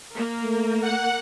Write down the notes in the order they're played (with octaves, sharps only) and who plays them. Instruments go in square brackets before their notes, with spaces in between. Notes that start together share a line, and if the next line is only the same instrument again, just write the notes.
[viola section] A#3 A#4
[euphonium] A3
[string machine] F#5